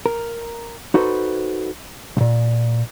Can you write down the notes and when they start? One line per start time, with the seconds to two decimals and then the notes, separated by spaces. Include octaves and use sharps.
0.06 A#4
0.94 D#4 F#4 A4 B4 C5 C6
2.17 B1 A#2